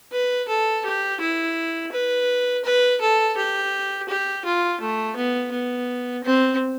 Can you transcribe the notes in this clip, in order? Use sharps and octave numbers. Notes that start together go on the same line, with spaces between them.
B4
A4
G4
E4
B4
B4
A4
G4
G4
F4
A3
B3
B3
C4